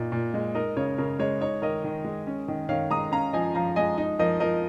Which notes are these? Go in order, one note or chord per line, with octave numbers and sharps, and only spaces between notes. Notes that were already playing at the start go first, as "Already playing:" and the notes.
Already playing: A#2 D#4
A#2
G#3
D#4 A#4 D#5
C#3 C#5
C#3 A#4
G#3 C#5
D#4 C#5
D#3 A#4 D#5
D#3
G#3
C#4
D#3
D#3 C#5 F5
G#3 A#5 D#6
C#4 F5 A#5
F3 D#5 G#5
F3 F5 A#5
G#3 D#5 G#5
D#4
F3 A#4 D#5
F3 A#4 D#5